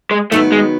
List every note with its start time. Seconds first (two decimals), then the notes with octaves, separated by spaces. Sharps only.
0.11 G#3
0.32 D#3 F#3 A3 B3
0.52 G#3